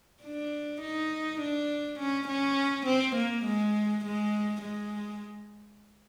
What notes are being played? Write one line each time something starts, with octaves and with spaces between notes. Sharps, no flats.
D4
D#4
D4
C#4
C#4
C4
A#3
G#3
G#3
G#3